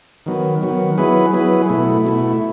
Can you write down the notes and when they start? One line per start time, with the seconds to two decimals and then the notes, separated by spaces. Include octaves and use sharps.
0.26 D#3 F#3 B3
0.62 D#3 F#3 B3
0.98 F#3 B3 E4 G#4 B4
1.33 F#3 B3 E4 G#4 B4
1.69 B2 A3 E4
2.05 B2 A3 E4